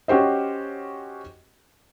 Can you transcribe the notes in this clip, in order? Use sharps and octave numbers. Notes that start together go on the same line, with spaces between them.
C#4 F#4 G4 C5 D#5